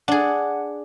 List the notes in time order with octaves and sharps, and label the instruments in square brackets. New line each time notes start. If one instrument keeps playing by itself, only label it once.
[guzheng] D4 G#4 [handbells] F#5